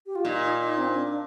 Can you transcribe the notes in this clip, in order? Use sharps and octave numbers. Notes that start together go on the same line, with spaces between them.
G4
F4
A#2 D#4
C4
D4